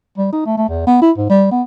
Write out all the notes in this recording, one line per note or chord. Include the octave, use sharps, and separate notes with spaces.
G3
D#4
A3
A3
E2
B3
E4
G#2
G3
B3